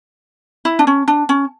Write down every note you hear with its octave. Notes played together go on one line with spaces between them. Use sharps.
E4
D4
C#4
D4
C#4